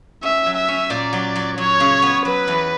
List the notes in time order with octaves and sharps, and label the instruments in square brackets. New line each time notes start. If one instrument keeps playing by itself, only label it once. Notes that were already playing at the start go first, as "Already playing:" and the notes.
[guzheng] C#4 [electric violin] E5
[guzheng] F#3
[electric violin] E5
[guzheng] C#4
[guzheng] A#2 [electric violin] D5
[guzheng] F#3
F#3
[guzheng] F#3 [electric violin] C#5
[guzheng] C#3
B3
[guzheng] F#3 [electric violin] B4
[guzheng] E2